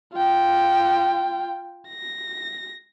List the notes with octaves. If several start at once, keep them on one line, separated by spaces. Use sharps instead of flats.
F4 G5
A#6